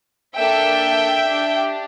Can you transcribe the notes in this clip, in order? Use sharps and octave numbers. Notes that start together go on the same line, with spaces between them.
A#3 D4 A4 E5 G5
D4 G4